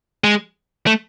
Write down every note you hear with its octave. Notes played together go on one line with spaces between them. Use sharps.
G#3
A3